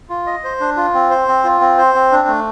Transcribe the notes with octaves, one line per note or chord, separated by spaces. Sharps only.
F4
D#5
C5
D4
F4
C4
C5
C4
F4
C4
C5
C4
D4
A3